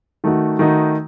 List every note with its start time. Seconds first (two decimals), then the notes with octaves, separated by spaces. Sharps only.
0.24 D#3 A3 D#4 F#4
0.59 D#3 A3 D#4 F#4